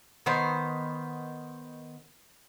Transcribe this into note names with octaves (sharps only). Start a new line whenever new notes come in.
D#3 B3 C5